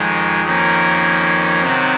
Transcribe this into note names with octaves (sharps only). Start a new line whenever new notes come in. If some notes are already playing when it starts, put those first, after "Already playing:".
Already playing: F2 D#3 G#3
F2 D#3 A#3 C#4
C3 D#3 F#3